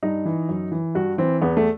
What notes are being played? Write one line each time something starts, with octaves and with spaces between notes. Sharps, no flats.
G2 D#4
E3
F#2
E3
G2 F#4
E3 C4
E2 B3
A3